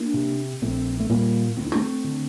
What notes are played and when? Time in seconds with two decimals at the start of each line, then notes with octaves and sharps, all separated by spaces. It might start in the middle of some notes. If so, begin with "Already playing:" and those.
Already playing: A#3 D4
0.14 C3
0.62 A#1 A3 C4
1.00 A3
1.09 A#2 G3 A#3
1.57 D2 C4
1.66 D4
1.75 A3 C4
2.04 D3